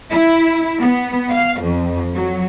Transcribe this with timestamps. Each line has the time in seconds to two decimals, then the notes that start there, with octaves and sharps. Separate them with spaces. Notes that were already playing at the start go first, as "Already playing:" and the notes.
0.11 E4
0.79 B3
1.31 F5
1.62 F2
2.14 F#3